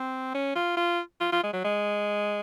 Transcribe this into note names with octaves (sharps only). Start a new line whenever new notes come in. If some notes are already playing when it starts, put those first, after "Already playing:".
Already playing: C4
C#4
F4
F4
F4
F4
G#3
F#3
G#3